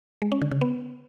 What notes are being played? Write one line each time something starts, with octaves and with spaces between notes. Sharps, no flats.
G#3
C#4
D3
C#3
B3